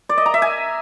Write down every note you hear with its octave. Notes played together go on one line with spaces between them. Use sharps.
D5
D#5
A#5
E5
G#5